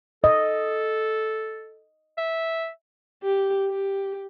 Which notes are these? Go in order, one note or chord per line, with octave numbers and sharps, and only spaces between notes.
A4 D#5
E5
G4
G4